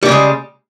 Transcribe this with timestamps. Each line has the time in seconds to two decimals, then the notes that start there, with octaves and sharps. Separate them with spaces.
0.03 G3
0.06 E3
0.09 C#3
0.12 G#3